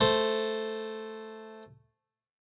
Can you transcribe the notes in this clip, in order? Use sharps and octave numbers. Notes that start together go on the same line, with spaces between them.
A3 C5